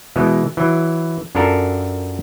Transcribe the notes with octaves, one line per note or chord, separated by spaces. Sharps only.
B2 E3 G#3
E3 F#3
F#2 D4 F4 A4 A#4